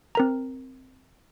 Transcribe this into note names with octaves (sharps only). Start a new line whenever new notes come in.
C4 A#4 A#5